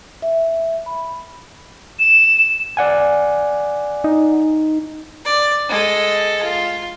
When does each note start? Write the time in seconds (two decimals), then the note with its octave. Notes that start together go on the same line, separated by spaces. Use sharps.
0.22 E5
0.86 B5
1.99 E7
2.77 D5 F#5 G#5
4.04 D#4
5.25 D5
5.69 G#3 A4
6.43 F4